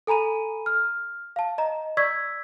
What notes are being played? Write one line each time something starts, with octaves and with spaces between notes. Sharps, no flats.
A4 G#5 A#5 B5 D#7
F6
F5 A5
D#5 A#5
D5 C#6 E6 G#6 B6